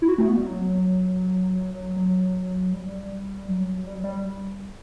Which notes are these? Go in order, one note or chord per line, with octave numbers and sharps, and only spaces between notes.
E4
F#4
A3
B3
G3
F#3
F#3
G3
F#3
G3
F#3
G3